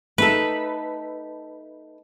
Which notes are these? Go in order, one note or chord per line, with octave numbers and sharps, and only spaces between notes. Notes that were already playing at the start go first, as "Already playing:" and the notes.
A3 D#4 A4 B4